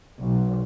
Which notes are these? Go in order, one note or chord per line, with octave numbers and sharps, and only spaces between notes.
B1